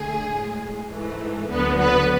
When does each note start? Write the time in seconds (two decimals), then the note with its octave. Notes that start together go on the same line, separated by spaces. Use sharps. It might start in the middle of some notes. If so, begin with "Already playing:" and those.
Already playing: D2 D3 A3 G#4
0.33 A2 G#3
0.91 G#2 E3 A3
1.49 D2 D3 F#3 B3 B4
1.79 B3 B4